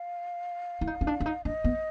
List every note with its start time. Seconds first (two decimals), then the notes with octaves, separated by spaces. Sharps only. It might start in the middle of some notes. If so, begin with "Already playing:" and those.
Already playing: F5
0.81 E4
0.87 D#4
1.01 C#4
1.07 D4
1.20 D4
1.26 D#4
1.45 D4 D#5
1.64 B3